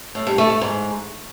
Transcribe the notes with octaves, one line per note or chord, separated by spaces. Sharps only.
A2
G2
A3
A3
G#2